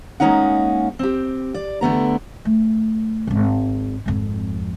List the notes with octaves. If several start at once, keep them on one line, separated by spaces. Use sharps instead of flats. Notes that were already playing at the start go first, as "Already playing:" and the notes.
G#3 A#3 C#4 D#4 F#5
C4 G4
D5
D3 A3 B3 A#5
A3
D#1 G#1
G#1 F2